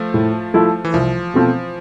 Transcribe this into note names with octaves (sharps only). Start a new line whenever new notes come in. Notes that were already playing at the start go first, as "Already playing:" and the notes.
Already playing: F3 A3
A2
F3 A3 E4
E3
C2 F3
B2 A3 C4 F4